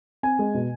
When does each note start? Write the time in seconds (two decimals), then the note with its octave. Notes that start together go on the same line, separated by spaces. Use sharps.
0.23 C4 G#5
0.39 G#3
0.54 B2